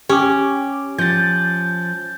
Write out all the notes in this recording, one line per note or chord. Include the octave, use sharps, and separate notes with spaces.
C#4 G4 D6
F3 G6 A6